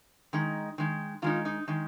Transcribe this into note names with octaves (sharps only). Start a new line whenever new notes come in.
D#3 G#3 D#4
D#3 G#3 D#4
D#3 G#3 D#4 F4
D#4
D#3 G#3 D#4